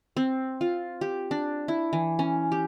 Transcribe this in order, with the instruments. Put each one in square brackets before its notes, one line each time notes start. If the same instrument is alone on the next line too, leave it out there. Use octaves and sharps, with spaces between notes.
[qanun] C4
F4
G4
D4
E4
E3
C#4
G4